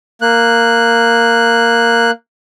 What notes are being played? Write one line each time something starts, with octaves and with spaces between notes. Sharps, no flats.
A#3 F#6